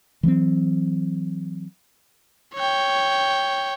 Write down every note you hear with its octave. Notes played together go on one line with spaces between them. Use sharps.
E3 F#3 A#3 C4
C#5 G5